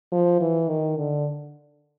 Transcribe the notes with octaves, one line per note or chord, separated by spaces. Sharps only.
F3
E3
D#3
D3